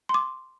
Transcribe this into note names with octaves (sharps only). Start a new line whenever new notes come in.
C6
D6